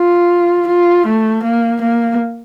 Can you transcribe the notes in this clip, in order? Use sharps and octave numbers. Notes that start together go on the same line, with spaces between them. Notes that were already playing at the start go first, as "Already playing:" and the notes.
Already playing: F4
F4
A3
A#3
A#3